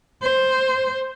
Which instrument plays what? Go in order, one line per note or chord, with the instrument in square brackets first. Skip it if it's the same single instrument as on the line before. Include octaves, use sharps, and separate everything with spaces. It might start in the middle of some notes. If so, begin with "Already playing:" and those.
[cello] C5